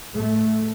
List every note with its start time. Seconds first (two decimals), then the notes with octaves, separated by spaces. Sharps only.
0.13 A2 A3